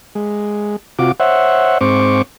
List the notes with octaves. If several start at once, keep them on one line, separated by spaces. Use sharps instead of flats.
G#3
C3 F4 F#4 D6
C5 C#5 E5 F#5
G#2 C4 C5 C#6 D6